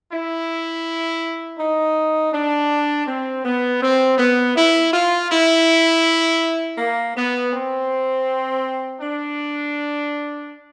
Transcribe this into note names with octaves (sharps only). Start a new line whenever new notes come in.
E4
D#4
D4
C4
B3
C4
B3
E4
F4
E4
A#3
B3
C4
D4